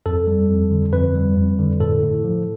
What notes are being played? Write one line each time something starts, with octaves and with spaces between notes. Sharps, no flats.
F2 A4
G3
F2
D3
F2 B4
G3
F2
D3
A2 A4
A2
F3